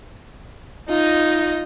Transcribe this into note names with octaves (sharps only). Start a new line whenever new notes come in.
D#4 F4 D#5